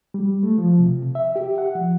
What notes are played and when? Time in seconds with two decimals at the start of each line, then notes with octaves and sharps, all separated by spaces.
0.14 G3
0.43 A3
0.58 F3
0.79 C3
1.15 E5
1.36 G4
1.58 F#5
1.75 F3